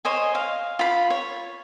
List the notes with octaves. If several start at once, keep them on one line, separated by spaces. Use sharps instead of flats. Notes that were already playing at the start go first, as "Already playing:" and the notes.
C5 C#5 D#5 G#5
F5
F4 B5
C#5